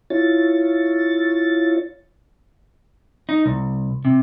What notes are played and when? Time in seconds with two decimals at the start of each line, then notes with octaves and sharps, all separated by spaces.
0.10 E4 F4 C#5 A6
3.29 D#4
3.46 C2
4.05 C3